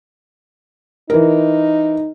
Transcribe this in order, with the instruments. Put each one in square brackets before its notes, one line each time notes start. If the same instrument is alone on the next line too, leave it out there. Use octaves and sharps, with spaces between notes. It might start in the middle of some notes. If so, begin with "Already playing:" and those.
[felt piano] E3 A#4 [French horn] D#4